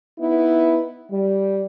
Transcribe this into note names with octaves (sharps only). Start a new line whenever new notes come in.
B3 D#4 E4
G3